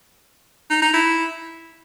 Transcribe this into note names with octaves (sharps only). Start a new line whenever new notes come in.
D#4
D#4
E4